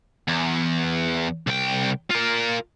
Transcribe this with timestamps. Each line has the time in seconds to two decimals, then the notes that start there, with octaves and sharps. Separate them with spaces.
0.28 E2
1.47 C2 G5
2.10 F4 A#4